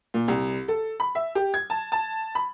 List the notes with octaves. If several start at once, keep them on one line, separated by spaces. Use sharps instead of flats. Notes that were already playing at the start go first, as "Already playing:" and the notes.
A#2
C2
A4
B5
E5
G4
G#6
A5
A5
B5